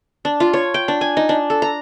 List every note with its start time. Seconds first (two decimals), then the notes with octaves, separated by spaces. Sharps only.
0.25 D4
0.40 F4
0.53 C#5
0.74 G5
0.88 D4
1.01 G#5
1.17 D#4
1.29 D4
1.50 A4
1.62 A#5